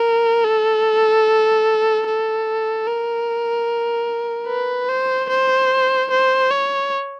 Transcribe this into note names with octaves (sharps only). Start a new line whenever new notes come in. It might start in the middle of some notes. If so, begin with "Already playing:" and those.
Already playing: A#4
A4
A4
A#4
B4
C5
C5
C5
C#5